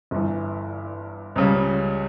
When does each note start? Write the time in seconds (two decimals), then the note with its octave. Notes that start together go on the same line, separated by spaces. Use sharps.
0.11 G1 G2 E3
1.36 C#2 C#3 G3